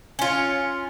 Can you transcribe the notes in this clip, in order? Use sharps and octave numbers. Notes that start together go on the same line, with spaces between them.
C#4 F4